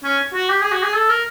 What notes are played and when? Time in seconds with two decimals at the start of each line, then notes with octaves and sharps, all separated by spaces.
0.04 C#4
0.34 F#4
0.49 G4
0.61 G#4
0.72 F#4
0.83 G#4
0.94 A4
1.09 A#4